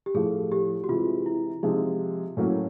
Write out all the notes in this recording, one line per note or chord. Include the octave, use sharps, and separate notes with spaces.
G4
A2 F3 A3 G#4
G4
F#4
C3 E3 G#3 F4
E4
C3 F3 G#3 D#4
A2 F#3 A#3 C#4